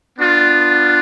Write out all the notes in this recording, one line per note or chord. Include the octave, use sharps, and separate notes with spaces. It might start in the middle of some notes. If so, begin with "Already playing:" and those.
B3 D4 F4